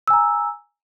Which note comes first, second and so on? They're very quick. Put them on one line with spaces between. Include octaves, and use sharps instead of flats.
E6 G#5 A#5